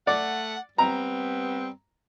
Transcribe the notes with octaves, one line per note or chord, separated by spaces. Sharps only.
A3 D5 F#5
G3 B3 C4 A#5